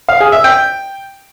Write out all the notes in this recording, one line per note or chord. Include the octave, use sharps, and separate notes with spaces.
F5
G#4
E5
G5